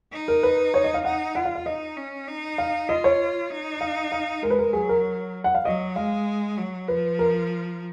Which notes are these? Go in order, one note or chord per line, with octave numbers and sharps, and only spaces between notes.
D#4
A#4
B4
C#5
D#5
F5
D#4 F#5
F4 F#5
F5
F5
D#4 D#5
C#4
D#4
F5
F4 D#5
C#5
D#4
F5
F5
G#3 A#4
B4
A#4
F#3 G#4
A#4
F#5
F5
F#3 D#5
G#3 F5
F#3
F3 B4
A#4